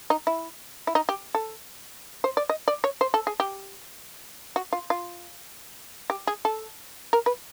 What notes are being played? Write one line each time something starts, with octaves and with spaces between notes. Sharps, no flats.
D#4
E4
E4
D#4
G4
A4
C5
D5
D#5
D5
C#5
C5
A4
G#4
G4
F#4
F4
F4
G4
G#4
A4
A#4
B4